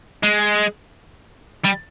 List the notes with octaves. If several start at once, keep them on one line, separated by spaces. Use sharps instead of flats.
G#3
G3